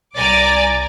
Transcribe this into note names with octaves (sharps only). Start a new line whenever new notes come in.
C2 D5 G#5 A#5 D6 A6